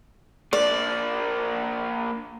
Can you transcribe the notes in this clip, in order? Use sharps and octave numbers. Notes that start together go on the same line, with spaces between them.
A#3 D4 D5